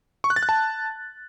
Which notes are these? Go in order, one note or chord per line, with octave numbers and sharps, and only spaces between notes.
C#6
F#6
A6
F#6
A5